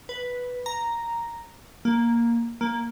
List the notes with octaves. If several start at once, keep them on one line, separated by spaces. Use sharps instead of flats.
B4
A#5
A#3
A#3